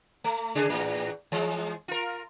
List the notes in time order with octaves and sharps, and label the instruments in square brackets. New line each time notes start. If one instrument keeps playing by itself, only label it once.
[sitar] A3
C#3 D4 G#4
E2 A2
E3 G#3
F4 A#4